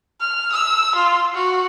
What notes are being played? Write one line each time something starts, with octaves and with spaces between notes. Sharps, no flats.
F6
E6
F4
F#4